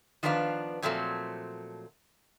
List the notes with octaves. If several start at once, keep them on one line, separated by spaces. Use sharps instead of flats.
D#3 F3 B3 D4 B4 F5
A#2 F3 F#3 A3 C4